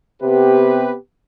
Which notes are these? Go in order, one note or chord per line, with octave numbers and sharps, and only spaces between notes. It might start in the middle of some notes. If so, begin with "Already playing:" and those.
C3 B3 G4 B4